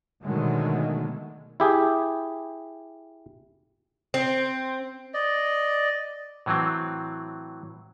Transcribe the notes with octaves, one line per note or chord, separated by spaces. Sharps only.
B2 D3 D#3 F#3 G#3 A3
E4 G4 G#4
C4
D5 D#5
A2 E3 F#3 C4